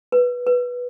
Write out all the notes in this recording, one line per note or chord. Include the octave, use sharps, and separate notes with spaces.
B4
B4